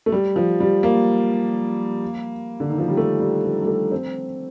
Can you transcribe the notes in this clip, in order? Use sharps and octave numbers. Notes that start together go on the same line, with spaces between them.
A3
G3
F3
G3
A#3
D3
D#3
F3
G3
A3
G3
F3
G3
A3
C4